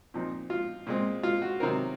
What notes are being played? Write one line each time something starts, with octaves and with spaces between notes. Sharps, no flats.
A#2 F3 C4 D#4
F4
A#2 G#3 C4
F4
F#4
C3 D#3 F#3 C4 A#4